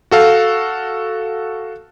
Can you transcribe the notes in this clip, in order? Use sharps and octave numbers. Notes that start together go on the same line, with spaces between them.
F#4 A4 F5